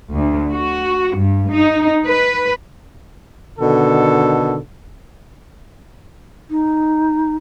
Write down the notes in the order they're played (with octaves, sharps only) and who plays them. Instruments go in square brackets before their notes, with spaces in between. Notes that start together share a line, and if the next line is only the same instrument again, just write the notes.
[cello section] D2
F#4
G2
D#4
B4
[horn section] B2 D3 D#3 A4
[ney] D#4